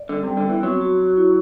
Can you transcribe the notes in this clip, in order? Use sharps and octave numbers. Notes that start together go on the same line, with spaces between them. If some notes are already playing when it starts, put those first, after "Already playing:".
Already playing: D5
D3 G3
C3
G3
D3
E3 B3
F#3 C4
F#4
F#4
E4